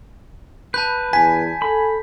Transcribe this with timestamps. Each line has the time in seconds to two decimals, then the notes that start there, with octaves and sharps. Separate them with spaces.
0.74 B4 A5 B5 G6
1.13 E2 G#5 B6
1.62 A4 B5